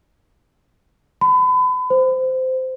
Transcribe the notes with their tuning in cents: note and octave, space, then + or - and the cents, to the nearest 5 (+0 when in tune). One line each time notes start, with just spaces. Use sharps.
B5 +35
C5 -15